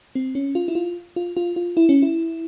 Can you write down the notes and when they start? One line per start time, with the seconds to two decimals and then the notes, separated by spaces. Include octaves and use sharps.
0.15 C4
0.35 C#4
0.55 F4
0.68 E4
0.75 F4
1.16 F4
1.37 F4
1.56 F4
1.77 E4
1.89 C#4
2.03 E4